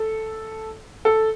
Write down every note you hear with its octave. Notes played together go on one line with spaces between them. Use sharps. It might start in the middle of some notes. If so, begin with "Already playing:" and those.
Already playing: A4
A4